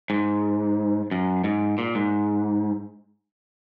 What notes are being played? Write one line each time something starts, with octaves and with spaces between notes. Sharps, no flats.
G#2
F#2
G#2
A#2
G#2